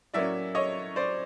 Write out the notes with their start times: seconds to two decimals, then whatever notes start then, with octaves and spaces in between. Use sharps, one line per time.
0.14 A2 F#3 A#3 C#4 D5 E5
0.55 C#5 D#5
0.96 C5 D5